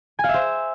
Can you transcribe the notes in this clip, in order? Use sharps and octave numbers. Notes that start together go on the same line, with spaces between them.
G#5
F5
E5
C5